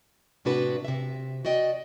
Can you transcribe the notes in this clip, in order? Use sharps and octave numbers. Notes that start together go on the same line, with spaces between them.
A2 C3 B3 D4 F#4 B4
C3 E5
F#4 D5 D#5 G5